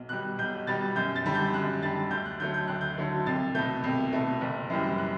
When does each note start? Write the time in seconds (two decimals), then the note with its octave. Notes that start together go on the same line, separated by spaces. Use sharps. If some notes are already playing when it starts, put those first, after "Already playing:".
Already playing: B1
0.09 B2 G3 F#6
0.38 B1 G6
0.67 B2 G3 A6
0.96 F#2 G6
1.16 A6
1.25 D3 G3
1.35 G6
1.53 F#2 F#6
1.82 D3 G3 A6
2.10 D2 G6
2.26 F#6
2.39 D3 F#3 A3 G6
2.54 G6
2.68 D2 F#6
2.81 G6
2.98 D3 F#3 A3
3.26 C2 A6
3.55 B2 A3 G6
3.84 C2
4.13 B2 A3
4.41 F#1
4.70 F#2 E3 G3
4.98 F#6